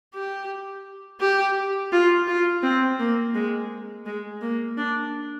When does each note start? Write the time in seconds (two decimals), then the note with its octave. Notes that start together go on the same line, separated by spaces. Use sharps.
0.14 G4
1.20 G4
1.92 F4
2.28 F4
2.63 C4
2.99 A#3
3.34 G#3
4.06 G#3
4.42 A#3
4.77 D4